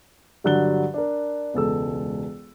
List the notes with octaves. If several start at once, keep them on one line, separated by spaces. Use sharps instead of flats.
G2 D3 F#3 F#6 A6 G7
D4 A#4
E1 C#2 A4 E6